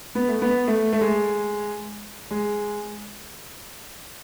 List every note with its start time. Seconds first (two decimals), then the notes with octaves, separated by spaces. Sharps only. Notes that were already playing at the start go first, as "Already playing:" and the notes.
0.15 B3
0.28 A3
0.42 B3
0.67 A3
0.93 A3
1.01 G#3
2.31 G#3